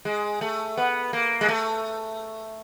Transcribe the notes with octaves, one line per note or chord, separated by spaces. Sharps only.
G#3
A3
B3
A#3
G#3
A3